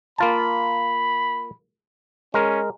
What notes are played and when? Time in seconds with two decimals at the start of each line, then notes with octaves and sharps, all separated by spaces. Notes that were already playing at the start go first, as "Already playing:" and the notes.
0.18 A#3 F4 A5 B5
2.34 G#3 C#4 A#4